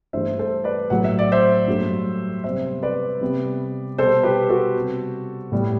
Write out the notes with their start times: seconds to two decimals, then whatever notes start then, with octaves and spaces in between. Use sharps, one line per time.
0.13 G2 E3 A3 C5 E5
0.39 A4 C5
0.64 B4 D5
0.90 A2 F#3 A3 F#5
1.04 E5
1.19 D5
1.32 C5 E5
1.67 G2 F#3 A3
2.44 C3 G3 B3 C5 E5
2.83 B4 D5
3.21 C3 G3 B3
3.98 B2 G3 B3 A4 C5
4.23 G4 B4
4.49 F#4 A4
4.75 C3 G3 B3
5.52 A2 G3 B3